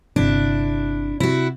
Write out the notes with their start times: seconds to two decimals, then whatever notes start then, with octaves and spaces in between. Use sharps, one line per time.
0.16 G1 C3 D4 E4
1.20 C3 E4 F#4